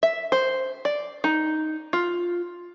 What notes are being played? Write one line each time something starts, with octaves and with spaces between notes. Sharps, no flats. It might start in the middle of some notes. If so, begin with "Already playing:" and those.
E5
C5
D5
D#4
F4